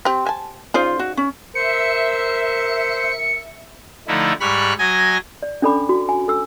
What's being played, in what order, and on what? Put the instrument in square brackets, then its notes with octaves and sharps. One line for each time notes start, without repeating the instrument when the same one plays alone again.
[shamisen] C4 G4
G#5 A5
[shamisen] C#3 D#4 D5 [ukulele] F4 C5
[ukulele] F#4
C#4
[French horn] A#4 [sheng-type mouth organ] C5 [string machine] E5 [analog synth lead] C#7
[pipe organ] D3 F3 A3 D#4 E4
G#2 G3 B5 C#6 F6 F#6
F#3 D#5 G#5 A#6
[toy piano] D5
C#4 D4 A4 D5 B5 D6
F#4
G#5
A4 E6